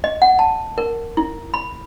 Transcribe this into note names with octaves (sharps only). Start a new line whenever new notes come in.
D#5
F#5
A5
A#4
E4
B5